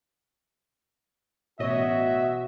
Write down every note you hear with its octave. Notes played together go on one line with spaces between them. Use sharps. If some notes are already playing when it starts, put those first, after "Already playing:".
A1 B2 F#4 C#5 D#5 E5